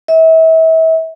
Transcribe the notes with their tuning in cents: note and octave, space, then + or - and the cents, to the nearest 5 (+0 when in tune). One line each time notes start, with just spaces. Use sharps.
E5 -35